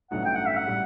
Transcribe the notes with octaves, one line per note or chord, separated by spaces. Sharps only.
A1 G2 F#3 A3 D#4 F#5
G5
F#5
E5
F#5
A2 G3